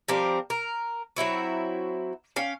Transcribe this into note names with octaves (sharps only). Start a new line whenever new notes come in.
F3 G3 C4 A#4
A#4
F#3 C4 E4 F#4
C#4 F5 G5